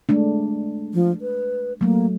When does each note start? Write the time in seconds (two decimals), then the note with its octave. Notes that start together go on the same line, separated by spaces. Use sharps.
0.09 G#3 A3 D4
0.94 F3
1.21 B4
1.81 F#3 A3 A#3